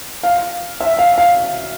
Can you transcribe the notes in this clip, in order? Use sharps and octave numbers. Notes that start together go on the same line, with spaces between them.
F5
E5
F5
F5